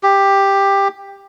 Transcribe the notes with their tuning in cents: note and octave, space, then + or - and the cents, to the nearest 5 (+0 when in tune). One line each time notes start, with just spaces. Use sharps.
G4 +10